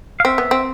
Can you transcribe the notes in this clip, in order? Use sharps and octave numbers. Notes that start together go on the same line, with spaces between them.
F5
C4 E5
B3
C4